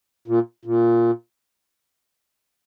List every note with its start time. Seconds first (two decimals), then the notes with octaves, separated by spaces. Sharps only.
0.28 A#2
0.65 A#2